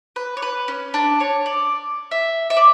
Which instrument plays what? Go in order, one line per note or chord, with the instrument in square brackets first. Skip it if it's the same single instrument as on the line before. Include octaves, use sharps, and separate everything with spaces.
[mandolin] B4
C#5
B4
C#4
D4
C#5
D5
E5
E5
D5